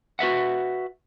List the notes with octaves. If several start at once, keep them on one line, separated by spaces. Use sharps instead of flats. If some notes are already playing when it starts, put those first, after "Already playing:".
F#4 B4 E5 F#5